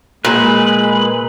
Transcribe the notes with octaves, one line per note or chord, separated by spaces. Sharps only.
A#2 G#3 B4 F#7